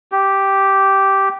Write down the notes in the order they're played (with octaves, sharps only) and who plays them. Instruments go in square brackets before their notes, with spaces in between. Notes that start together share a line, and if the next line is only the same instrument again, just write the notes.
[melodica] G4